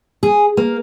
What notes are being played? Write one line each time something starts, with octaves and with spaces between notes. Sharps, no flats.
G#4
A#3